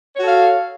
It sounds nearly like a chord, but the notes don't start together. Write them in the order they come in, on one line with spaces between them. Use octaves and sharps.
C#5 F#4 A4 F5